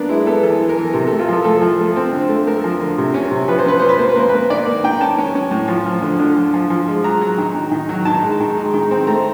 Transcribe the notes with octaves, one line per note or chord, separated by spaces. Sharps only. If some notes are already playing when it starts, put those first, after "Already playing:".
Already playing: A#3 B3 D4
G#3 E4
B3 A4
E3 A4
E3
A#4
E3
C3 A#4
A4
A3
F4
F3 A4
A3 A4
F3
A3
C4
D3
A3
A3 A#4
F3
D3
C3
C#4
C3
F3 B4
C5
C#4 B4
C#4 C5
B4
A#3 C5
B4
A#3 C5
A#3 B4
D#3 D5
A#3
D#3 G5
C#4 A5
C#4
C#4
A2
F3
F3
D3
D3
F3
F3
F3
G#3
F#3 A#5
F#3
D#3
D#3
D#3
F#3
D#3 A5
G#3
D#3
G#3
D#3
C4
A3 A#5